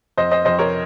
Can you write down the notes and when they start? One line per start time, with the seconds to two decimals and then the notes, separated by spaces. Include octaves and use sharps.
0.17 F2 C5 D#5
0.31 C5 D#5
0.45 F2 C5 D#5
0.59 A#4 C#5